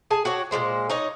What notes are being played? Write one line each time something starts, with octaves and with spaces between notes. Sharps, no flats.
G#4 G#5 A5
F#4 G4 C#5
A#2 E3 G#3 C5
D#4 C#5 D#5